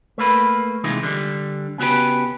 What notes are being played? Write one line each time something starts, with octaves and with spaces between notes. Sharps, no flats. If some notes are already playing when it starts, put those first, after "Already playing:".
A3 A#3 B4
C3 E3 G#3 D#4 F4
D3 G3
C#3 B3 F#4 G4 B4